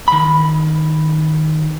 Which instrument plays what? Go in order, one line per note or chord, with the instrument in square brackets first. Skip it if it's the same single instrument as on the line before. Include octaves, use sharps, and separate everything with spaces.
[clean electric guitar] D#3 B5